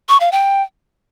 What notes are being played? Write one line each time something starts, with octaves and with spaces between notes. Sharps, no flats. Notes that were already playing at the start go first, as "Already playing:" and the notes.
C#6
F5
G5